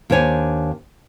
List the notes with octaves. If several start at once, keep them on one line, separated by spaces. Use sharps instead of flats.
D#2 D4 C5 C#5 G#5